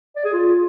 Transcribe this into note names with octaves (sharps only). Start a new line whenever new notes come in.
D5
G#4
F4